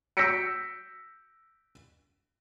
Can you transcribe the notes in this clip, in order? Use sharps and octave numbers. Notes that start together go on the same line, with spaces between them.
E6 G6 A#6 B6 C#7 D7